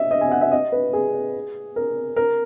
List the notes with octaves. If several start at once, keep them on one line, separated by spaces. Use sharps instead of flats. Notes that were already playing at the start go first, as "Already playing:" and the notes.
Already playing: D#5 E5
D#5
G#5
F#5
E5
D#5
B4
G#4
A#4
A#4